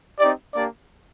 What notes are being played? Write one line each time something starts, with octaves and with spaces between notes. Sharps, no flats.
C4 D#4 G4 D5
A#3 D4 G4 D5